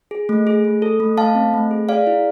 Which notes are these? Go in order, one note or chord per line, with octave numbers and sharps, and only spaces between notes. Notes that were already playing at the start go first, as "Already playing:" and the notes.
G#4
A3
G#4
A3
A4
A3
A3 F5 A5
C4
A3
G#4
G#4 D5 F5
E4